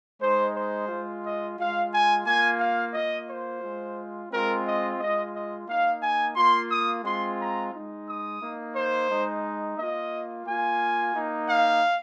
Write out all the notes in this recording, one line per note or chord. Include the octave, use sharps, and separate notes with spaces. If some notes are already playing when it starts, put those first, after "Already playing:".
G#3 D#4 C5
C5
G#3 F4
D#5
G#3 F4 F5
G#5
A#3 F4 G#5
F5
A#3 F4 D#5
C5
G#3 F4
G#3 C4 F4 A#4
D#5
G#3 F4 D#5
D#5
A#3 D#4 F5
G#5
A#3 F4 C6
D#6
G#3 C4 F4 C6
A#5
G#3 D#4
D#6
A#3 D#4
C5
G#3 D#4
A#3 F4 D#5
A#3 F4 G#5
A#3 D#4
F5